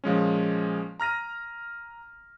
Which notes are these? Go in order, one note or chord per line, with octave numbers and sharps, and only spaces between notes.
A#2 F3 G#3 C#4
A#5 F6 A#6 D#7